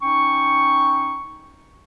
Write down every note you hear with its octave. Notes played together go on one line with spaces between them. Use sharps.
C#4 D#4 G5 C#6